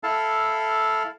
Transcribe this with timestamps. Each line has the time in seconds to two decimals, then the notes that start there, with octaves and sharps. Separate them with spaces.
0.03 E4 A4 F5 A5